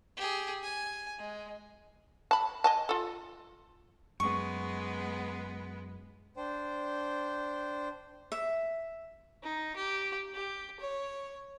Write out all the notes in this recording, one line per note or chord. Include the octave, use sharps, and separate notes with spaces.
G4 G#4
G#5
G#3
A5 B5
D#5 G#5 A5
F4 A4
F#2 G#3 B3 C#6
D4 C5 G5
E5
D#4
G4
G4
C#5